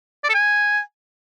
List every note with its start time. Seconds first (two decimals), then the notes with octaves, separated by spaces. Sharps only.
0.24 D5
0.29 A4
0.34 G#5